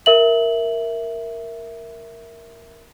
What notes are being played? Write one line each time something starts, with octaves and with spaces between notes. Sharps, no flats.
A#4 E5 F#7